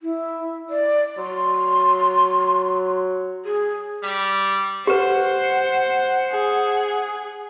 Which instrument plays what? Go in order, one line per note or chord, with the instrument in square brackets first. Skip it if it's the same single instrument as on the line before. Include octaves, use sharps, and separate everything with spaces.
[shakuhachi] E4
D5
[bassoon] F#3 [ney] C6
[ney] G#4
[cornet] G3
[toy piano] G4 B4 [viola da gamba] C5 [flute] F#5
[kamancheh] G#4